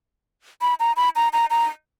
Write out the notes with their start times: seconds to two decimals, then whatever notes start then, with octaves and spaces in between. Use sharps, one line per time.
0.62 B5
0.80 A#5
0.97 B5
1.16 A#5
1.33 A#5
1.51 A#5